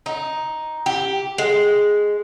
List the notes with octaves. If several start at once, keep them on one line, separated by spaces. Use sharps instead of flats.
D#4
G4
G#3